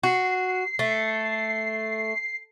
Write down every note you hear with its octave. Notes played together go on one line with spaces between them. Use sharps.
F#4 C7
A3